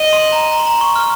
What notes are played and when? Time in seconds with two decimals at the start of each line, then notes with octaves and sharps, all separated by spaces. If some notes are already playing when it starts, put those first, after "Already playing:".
Already playing: D#5
0.13 C6
0.32 A#5
0.52 A#5
0.59 C6
0.67 A#5
0.81 C#6
0.96 F6